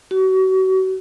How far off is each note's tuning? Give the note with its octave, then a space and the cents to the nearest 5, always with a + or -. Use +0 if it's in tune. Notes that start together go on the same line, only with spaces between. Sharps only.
F#4 +35